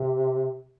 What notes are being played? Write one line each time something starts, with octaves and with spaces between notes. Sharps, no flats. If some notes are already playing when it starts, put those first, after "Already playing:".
Already playing: C3